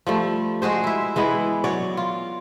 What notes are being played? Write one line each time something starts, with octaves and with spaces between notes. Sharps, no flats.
F3 G3 A3
G#3 F#4 G#4 C5
E4 E5
E3 G#3 B3 E4
F#3 C#5 D5
F4